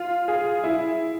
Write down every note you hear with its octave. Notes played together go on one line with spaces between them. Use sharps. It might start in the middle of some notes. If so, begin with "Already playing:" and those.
Already playing: F4
G#4
E4